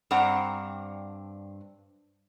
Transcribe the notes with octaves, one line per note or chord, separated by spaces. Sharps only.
G2 C4 D4 F#5 A#5